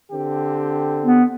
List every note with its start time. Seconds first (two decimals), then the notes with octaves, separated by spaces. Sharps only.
0.12 D3 C4 G4
1.02 B3